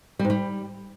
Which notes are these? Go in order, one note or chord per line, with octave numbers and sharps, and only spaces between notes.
G3
G#2
G3